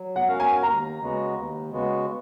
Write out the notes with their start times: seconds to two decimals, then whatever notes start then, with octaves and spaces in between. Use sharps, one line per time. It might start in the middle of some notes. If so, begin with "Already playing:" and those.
Already playing: F#3
0.16 F#5
0.27 C#4 F#4 A#4 F5
0.40 G#5
0.63 D#2 A#5
1.00 C#3 G#3 B3 F#4
1.35 D#2
1.71 C#3 G#3 B3 F#4